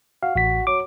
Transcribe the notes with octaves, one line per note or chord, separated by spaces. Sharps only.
F#4 F5
A1 F#4 B6
F#3 D6